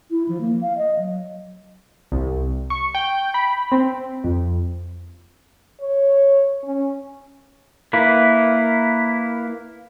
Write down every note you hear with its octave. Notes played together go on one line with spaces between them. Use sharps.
E4
F3
A#3
F5
D#5
F#3
C2
C#6
G5
B5
C4
F2
C#5
C#4
A#3 E4 B4